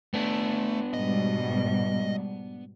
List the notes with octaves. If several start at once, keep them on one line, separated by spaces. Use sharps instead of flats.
A3 B3 D4
G#2 B2 G3 D#5